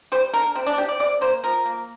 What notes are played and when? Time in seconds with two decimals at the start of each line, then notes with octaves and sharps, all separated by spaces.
0.12 G3 C5
0.34 D3 A#4
0.55 C3 C4
0.67 D4
0.78 C3 G4
0.89 D5
1.00 C3 D5
1.21 A#3 C5
1.43 F3 A#4
1.66 A#3